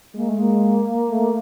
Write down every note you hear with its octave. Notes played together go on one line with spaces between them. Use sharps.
G#3 A#3
A3
A#3
A3